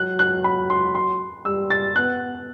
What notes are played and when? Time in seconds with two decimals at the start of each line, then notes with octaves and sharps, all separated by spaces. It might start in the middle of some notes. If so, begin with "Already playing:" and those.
Already playing: F#3 F#6
0.19 F#6
0.44 B5
0.70 C6
0.95 C6
1.45 G3 E6
1.70 A6
1.96 B3 F#6